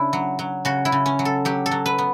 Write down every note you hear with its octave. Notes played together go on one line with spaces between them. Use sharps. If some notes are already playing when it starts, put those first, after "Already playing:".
Already playing: C#3 D4 E4
F#3
F#3
C#3 F#4
E4
C#3
C#4
F#3
A4
F#3 G4
A4
F#3
B4
B3